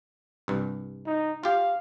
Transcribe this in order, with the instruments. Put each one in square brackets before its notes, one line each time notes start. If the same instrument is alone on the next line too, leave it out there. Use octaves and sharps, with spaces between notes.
[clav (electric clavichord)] C2 G2
[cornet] D#4
[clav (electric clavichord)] F4 G4 [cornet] F5